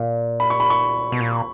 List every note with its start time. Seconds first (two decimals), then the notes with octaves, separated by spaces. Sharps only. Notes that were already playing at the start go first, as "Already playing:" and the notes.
Already playing: A#2
0.40 B5
0.50 C#6
0.60 B5
0.70 C#6
1.12 B2
1.21 A#2